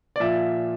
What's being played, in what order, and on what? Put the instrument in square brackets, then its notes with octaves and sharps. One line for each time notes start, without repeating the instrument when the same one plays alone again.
[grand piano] D5
A#2 F3 E5